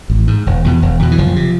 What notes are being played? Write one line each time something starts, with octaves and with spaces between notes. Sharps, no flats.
A1
G#2
E1
E2 B2
E1
E2 B2
E3
F#1 F3
C3